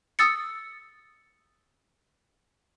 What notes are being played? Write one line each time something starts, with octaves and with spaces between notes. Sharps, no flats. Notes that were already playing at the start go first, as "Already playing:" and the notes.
D#6 E6 A6 C#7